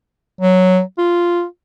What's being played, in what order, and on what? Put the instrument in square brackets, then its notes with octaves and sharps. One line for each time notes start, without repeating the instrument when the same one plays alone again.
[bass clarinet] F#3
F4